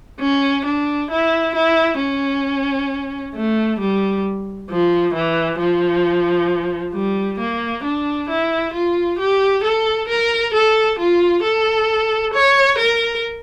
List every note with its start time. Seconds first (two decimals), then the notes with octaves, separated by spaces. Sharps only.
0.20 C#4
0.65 D4
1.10 E4
1.55 E4
2.00 C#4
3.35 A3
3.80 G3
4.70 F3
5.14 E3
5.59 F3
6.94 G3
7.39 A#3
7.84 D4
8.30 E4
8.73 F4
9.19 G4
9.63 A4
10.08 A#4
10.54 A4
10.99 F4
11.44 A4
12.34 C#5
12.79 A#4